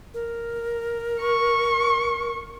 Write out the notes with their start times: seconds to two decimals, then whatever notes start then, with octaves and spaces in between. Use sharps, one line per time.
0.14 A#4
1.21 C#6